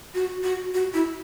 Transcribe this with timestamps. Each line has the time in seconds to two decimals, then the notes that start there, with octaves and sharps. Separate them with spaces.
0.14 F#4
0.43 F#4
0.74 F#4
0.94 E4